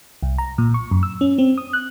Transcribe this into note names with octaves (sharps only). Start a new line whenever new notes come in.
C2
A#5
A#2
C#6
F#2
E6
C#4
C4
D#6
F#6